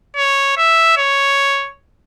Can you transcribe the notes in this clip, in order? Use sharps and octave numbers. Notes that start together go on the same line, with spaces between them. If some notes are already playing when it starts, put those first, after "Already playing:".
C#5
E5
C#5